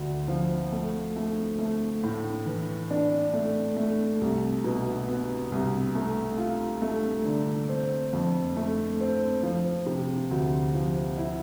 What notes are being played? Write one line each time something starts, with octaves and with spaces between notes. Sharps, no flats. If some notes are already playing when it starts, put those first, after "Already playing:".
Already playing: D2 D3
F3
A3
A3
A3
A2
E3
D4
A3
A3
C2
B2
B3
C2
A3
F4
A3
D3
C4
F2
A3
C4
F3
C3
D2
F3
E4